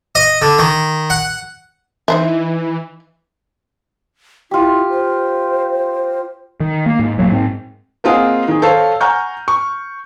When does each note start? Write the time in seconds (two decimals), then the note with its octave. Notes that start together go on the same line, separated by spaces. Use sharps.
0.15 D#5
0.42 D3
0.59 D#3
1.10 F#5
2.08 E3 D#4 C5 E5
4.51 E4 F4 G4
4.90 C5
6.60 D#3
6.86 A#3
6.99 G#2
7.18 D#1 F#3 G3 A#3
7.32 G#2 C4
8.04 A#3 C4 F4 G#4 D#5 F#5
8.48 D#3 G#4
8.62 A4 C5 C#5 F5
9.01 F#5 G#5 A#5 C#6 F6 G6
9.48 C#6